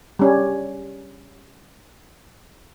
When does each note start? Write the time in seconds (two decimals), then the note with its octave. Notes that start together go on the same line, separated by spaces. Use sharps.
0.19 G3 C#4